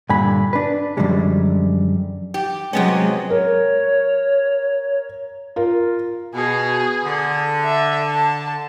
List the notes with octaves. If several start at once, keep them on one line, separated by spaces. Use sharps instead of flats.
G2 A#2 D3 G#5 B5
D4 B4
F#2 A2 D3 F3 G3 G#3
G4
C3 F#3 G#3 B3 C#4
A#4 C#5
F4 A#4
B2 G#4
D3
E5
A5